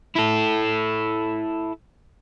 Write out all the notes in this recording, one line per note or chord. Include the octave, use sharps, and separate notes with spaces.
E4 A4